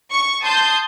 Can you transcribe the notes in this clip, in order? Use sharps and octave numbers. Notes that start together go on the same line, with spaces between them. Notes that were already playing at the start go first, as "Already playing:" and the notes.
C#6
A5 C6 D#6 G6